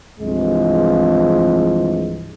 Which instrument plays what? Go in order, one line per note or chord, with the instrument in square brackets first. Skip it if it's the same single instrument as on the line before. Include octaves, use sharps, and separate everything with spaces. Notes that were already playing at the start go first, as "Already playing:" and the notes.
[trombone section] C2 G2 E3 F3 G#3